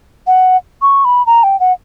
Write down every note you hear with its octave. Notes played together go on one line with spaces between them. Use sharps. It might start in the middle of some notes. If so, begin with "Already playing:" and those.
F#5
C#6
B5
A#5
G5
F#5